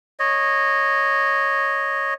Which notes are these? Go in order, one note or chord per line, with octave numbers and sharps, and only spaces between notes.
C#5 D#5